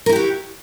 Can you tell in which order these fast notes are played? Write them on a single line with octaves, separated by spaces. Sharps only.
A#4 E4 G4 F#4